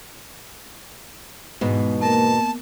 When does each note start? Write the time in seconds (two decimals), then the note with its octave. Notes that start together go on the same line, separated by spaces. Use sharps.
1.61 E2 G#2 B2 B3
2.01 A#3 A#4 A5